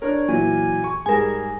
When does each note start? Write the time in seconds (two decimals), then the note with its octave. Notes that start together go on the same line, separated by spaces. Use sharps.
0.02 D4 A#4 C#5
0.28 A#2 E3 F#3 G#5
0.84 C#6
1.06 G#2 G3 G#4 A#4 G#5